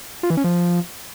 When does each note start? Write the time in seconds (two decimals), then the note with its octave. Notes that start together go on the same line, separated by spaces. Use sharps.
0.23 F4
0.30 E3
0.37 C#4
0.44 F3